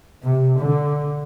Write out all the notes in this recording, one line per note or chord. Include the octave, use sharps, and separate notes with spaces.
C3
D3